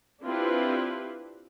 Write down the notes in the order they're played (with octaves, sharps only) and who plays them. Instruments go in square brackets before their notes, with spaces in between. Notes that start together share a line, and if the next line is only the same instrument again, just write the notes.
[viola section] C4 D4 E4 F4 G4 B4